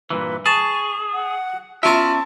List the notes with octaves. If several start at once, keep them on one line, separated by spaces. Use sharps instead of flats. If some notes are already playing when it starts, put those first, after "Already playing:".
G2 A#2 E3 B4
G#4 A5 C#6
F#5
B3 C#4 E4 F4 E5 A5 A#5